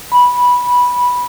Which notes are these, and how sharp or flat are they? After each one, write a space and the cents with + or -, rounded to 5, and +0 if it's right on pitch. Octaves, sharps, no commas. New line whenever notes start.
B5 -10